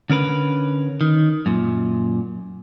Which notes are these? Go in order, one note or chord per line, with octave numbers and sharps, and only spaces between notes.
D3 C#4 A#4 B4
D#3
F#2 A#2